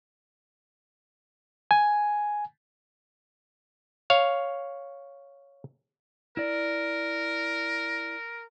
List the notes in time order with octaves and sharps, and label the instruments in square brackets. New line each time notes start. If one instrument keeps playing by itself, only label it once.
[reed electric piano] G#5
[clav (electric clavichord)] C#5 F5
[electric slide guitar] E4 D5 [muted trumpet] A#4